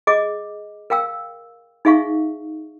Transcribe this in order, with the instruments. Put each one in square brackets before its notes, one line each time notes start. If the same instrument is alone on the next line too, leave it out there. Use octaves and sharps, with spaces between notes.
[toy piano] G#4 D#5 D6
A#4 F5 G5 E6
D#4 G#4 E5 F5 C#6